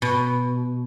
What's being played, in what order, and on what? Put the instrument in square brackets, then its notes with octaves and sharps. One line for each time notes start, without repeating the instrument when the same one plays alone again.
[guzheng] B2